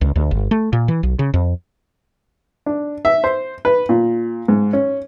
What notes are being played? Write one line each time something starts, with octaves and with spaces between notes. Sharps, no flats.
C#2
D2
G1
A3
A#2
E3
B1
C#3
F2
D4
E5
C5
B4
A#2
G#2
C#4